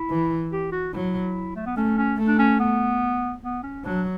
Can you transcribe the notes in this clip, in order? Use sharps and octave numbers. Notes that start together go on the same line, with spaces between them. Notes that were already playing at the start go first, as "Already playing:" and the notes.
Already playing: E4
E3
G4
F#4
F#3 E4
A3
B3
A3 C#4
C#4
A3
D4
C#4
B3
B3
C#4
F#3 D4